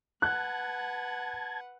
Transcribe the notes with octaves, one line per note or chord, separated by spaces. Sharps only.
B4 F#5 A5 F#6 G#6